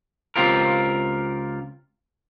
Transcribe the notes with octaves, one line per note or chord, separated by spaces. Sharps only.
C#2 C4 F4 G4 A#4